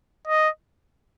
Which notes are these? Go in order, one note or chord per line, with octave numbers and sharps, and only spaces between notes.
D#5